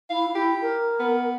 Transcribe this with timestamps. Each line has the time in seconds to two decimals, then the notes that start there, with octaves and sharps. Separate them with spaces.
0.10 E4 F5
0.35 E4 G4
0.61 A#4
1.00 B3